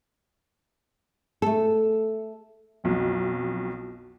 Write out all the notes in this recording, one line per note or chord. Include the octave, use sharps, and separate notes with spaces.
A3 A4
B1 F2